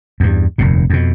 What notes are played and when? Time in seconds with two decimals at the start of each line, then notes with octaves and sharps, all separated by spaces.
0.20 E2 G2
0.58 F1 D#2 A#2
0.90 F2 B2